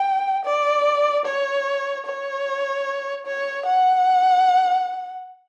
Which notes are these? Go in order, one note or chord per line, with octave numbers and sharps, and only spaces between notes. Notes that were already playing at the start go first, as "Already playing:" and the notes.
Already playing: G5
D5
C#5
C#5
C#5
F#5